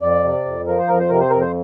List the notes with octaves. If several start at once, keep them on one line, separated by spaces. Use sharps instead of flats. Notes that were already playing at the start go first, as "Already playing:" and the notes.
F2 D5
C3
F2
F3 A#4
C5
F2 A#4
C5
C3 A#4
C5
F2 A#4
C5